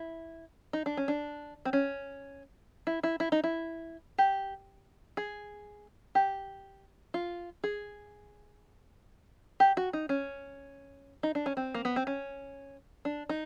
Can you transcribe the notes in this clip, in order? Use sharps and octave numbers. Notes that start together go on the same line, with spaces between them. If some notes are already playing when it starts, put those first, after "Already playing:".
Already playing: E4
D#4
D4
C#4
D4
C4
C#4
E4
E4
E4
D#4
E4
G4
G#4
G4
F4
G#4
G4
F#4
D#4
C#4
D#4
D4
C#4
C4
A#3
B3
C4
C#4
D4
D#4